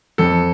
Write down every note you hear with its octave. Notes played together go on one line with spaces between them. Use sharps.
F2 A4